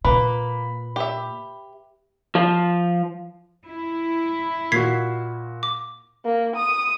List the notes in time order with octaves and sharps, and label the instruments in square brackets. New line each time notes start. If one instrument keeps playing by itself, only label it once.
[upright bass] A#2 [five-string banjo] A#3 [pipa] B4 [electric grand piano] B5
[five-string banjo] G4 E5
[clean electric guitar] F3
[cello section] E4
[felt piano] A#2 F#4 [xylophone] G#6 B6 C7
[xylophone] D6
[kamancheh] A#3
D#6